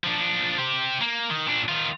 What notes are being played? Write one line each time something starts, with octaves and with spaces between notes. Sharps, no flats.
F3 D4
G4 C5
A#3
D#3
A#2 D4
D#3 F4